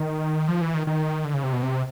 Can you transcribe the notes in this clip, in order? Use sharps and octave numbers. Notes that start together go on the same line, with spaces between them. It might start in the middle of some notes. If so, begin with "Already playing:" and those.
Already playing: D#3
F3
E3
D#3
D#3
D3
C#3
C3
B2
C3